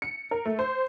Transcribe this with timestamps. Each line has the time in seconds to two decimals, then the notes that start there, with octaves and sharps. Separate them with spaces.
0.02 C#7
0.31 A#4
0.45 A3
0.59 C5